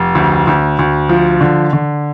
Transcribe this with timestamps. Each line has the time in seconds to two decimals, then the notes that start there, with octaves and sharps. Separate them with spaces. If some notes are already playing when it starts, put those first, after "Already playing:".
Already playing: F1
0.15 D2
0.47 D2
0.79 D2
1.09 F3
1.41 D3
1.73 D3